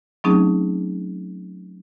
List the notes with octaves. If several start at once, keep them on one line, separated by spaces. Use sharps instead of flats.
F#3 A3 C4 C#4 D#4 G#4